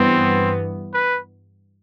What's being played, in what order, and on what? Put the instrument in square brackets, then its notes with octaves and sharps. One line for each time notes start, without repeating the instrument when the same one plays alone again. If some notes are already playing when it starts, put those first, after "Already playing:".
Already playing: [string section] G2 E3 B3 [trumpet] C4
[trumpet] B4